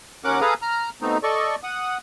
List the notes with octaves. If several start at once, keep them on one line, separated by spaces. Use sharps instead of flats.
D#2 C#4 A#4 F#5 D6
G#4 A4 B4 F5 A#5 D#6
A#5 F6
B2 A3 C4 D#4
A4 D5 D#5 C#6
F#5 D#6